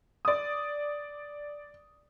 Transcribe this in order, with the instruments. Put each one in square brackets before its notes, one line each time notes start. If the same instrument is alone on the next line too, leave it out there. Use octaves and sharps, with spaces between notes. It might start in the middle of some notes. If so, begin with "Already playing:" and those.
[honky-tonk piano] D5 D#6